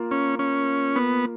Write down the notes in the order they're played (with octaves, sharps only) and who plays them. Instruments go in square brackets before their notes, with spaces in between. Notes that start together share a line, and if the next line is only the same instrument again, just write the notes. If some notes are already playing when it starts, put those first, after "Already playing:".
Already playing: [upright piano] A#3 F4 A#4
[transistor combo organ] C#4
C#4
B3